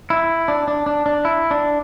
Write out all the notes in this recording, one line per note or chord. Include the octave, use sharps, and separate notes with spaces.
E4
D4
D4
D4
D4
E4
D4